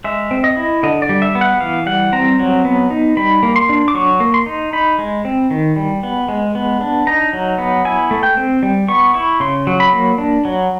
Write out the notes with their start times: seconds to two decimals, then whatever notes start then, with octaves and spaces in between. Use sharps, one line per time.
0.04 G#3 E5
0.31 C4
0.44 D#5
0.56 E4
0.83 D3 D#5
1.02 D5
1.09 G3
1.22 E5
1.35 B3
1.41 F#5
1.61 E3 F5
1.86 G3 F#5
2.12 C4 A#5
2.40 F#3
2.65 B3
2.90 D#4
3.17 G3 B5
3.43 A#3
3.56 C6
3.69 D4
3.88 D6
3.94 F#3 C#6
4.20 A#3
4.34 C6
4.46 D#4
4.73 D#4 B5
4.99 G#3
5.25 C4
5.51 D#3
5.76 G3
6.03 B3
6.28 G#3
6.55 B3
6.81 D4
7.07 D#4 A#5
7.33 F#3
7.58 B3
7.85 E4 G#5
8.11 A3
8.23 G5
8.37 C4
8.63 G3
8.88 B3 C#6
9.14 E4 C#6
9.40 C#3 C6
9.67 F#3
9.80 B5
9.93 A#3
10.18 D4
10.45 F#3